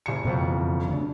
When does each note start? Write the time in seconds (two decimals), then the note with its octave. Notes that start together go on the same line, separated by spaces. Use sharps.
0.06 F#1 C#7
0.25 F2 B2 E3 F#3
0.88 D2 C#3 D4